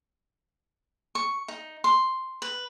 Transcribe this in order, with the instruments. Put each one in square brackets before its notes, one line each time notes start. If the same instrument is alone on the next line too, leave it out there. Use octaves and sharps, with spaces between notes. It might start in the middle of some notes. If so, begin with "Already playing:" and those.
[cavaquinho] C#6
D#4
C6
B4